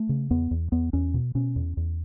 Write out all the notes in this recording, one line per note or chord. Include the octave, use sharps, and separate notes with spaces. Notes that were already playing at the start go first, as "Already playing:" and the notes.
Already playing: A3
C#3
E2 B3
E2
E2 B3
E2 C#4
B2
B2 C#4
E2
E2